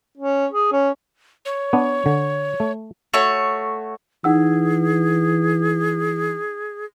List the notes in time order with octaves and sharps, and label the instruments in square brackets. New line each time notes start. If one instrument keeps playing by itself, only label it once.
[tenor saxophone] C#4
G#4
C#4
[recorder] C#5
[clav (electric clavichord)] B3 D4
D3
A3
[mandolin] A3 F#4 C#5
[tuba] E3 [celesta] D#4 F#5 E6 [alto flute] G#4